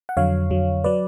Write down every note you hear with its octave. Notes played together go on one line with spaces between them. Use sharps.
F#5
F2 D3 F#3 C#5 F5
F2 D3 F#3
F#3 B4 D5